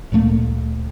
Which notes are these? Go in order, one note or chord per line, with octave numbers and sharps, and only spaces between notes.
D2 A#2 A3 A#3